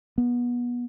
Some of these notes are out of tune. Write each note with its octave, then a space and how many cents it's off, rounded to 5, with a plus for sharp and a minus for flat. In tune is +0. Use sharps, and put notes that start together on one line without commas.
B3 -25